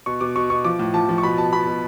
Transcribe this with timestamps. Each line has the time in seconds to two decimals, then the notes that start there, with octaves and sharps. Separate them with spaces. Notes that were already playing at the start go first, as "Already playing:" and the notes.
0.06 B2 C#6
0.21 B2 D6
0.36 B2 C#6
0.50 B2 C#6
0.65 F3 D6
0.79 A2
0.94 F3 A5
1.09 F3
1.18 C#6
1.23 B2 B5
1.38 B2 A5
1.53 B2 B5
1.67 B2